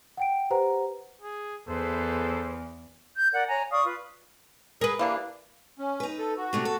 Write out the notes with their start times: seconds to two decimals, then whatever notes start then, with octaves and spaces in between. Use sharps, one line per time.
0.17 F#5 G5 D7
0.50 G4 B4 C5 F#5 A#5
1.21 G#4
1.68 E2 G#4 A4 B4 C5
3.15 G6
3.33 A#4 D5 F#5
3.48 C#5 G#5 A#5
3.71 D5 F5 C#6 D#6
3.85 F4 B4
4.81 G#4 A#4 B4
4.99 E3 G3 A#3 D4
5.79 C#4
6.00 D#4 B4
6.18 A4
6.37 F#4
6.53 C3 A3 D4
6.65 A4